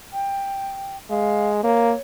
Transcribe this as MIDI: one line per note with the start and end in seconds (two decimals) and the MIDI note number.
0.13 0.97 79
1.10 1.62 56
1.10 1.50 77
1.63 1.93 58
1.63 2.01 73